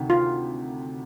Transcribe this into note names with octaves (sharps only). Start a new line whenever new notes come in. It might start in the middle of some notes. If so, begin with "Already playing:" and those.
Already playing: D2 C3 D#3
F4